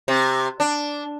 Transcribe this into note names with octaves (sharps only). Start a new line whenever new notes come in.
C3
D4